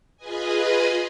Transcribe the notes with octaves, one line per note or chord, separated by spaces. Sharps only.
F4 G#4 B4 D#5 G#5